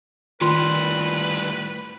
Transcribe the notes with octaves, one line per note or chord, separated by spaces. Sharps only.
A2 D#3 G3 F4 B4 C6